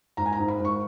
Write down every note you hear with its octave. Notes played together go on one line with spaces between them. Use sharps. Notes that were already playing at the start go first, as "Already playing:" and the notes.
G#1 A#5
G#5
A#5
G#2
B5
G#1 C#6